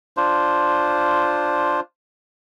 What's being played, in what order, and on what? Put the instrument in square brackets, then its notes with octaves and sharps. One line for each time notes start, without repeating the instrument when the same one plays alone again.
[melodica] D4 F4 C5